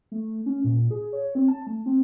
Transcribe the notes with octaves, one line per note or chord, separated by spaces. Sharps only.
A3
C#4
A#2
G#4
C#5
C4
A5
A3
C4